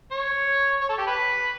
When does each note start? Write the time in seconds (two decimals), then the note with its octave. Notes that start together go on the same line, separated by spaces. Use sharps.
0.11 C#5
0.81 C#5
0.89 A4
0.98 G4
1.07 B4